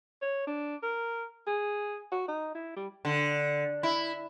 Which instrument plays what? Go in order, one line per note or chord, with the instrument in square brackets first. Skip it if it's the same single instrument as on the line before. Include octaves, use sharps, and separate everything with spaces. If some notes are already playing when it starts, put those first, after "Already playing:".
[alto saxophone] C#5
D4
A#4
G#4
F#4
D#4
E4
G3
[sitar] D3
E4